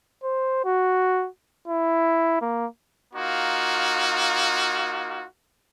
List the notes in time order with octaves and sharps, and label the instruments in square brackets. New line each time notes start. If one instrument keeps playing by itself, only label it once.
[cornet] C5
F#4
E4
A#3
[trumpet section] A#3 D#4 F4 F#4